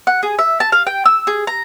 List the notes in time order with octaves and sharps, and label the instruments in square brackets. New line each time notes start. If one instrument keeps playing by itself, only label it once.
[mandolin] F#5
G#4
E5
A5
F5
G5
E6
G#4
A#5